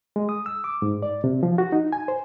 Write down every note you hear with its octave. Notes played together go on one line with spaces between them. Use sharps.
G#3
D#6
E6
D6
G#2
D5
C3
F3
F#4
D#4
G#5
C5